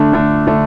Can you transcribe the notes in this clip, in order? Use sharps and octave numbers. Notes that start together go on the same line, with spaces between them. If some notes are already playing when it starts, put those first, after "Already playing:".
Already playing: D3 A3 D4
D3 A3 D4
D3 A3 D4